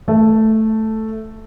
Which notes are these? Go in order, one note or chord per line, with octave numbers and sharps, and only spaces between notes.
A3